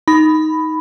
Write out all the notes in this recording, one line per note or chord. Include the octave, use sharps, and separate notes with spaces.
D#4 B5